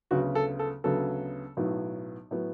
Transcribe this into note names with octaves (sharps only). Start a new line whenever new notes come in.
D2 C#3 F#3 B3 F#4
A4
A4
D2 C#3 F#3 B3 A4
B1 A2 F#3 B3
A2 F#3 B3